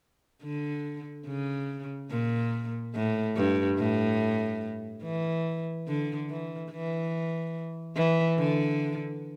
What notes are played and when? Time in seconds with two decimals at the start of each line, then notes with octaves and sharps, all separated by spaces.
0.43 D3
1.27 C#3
2.10 A#2
2.95 A2
3.36 G2
3.78 A2
5.03 E3
5.88 D3
6.29 E3
6.71 E3
7.96 E3
8.38 D3